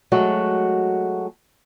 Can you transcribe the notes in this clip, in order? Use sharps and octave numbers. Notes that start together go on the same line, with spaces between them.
F#3 G#3 A3 F#4